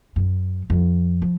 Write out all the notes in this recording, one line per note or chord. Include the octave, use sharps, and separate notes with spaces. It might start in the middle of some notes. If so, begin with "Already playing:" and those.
F#2
F2
F3